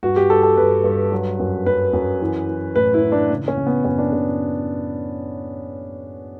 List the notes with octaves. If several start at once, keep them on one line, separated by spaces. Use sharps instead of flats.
G2 F#4
G4
G2 A4
A4
G2 B4
G2
F#3
F#2
F#2 B4
F#2
E3
E3
A2 B4
E4
E3
D4
C#3
C#4
C#3
B3
F#2 C#4
D4
C#3 C#4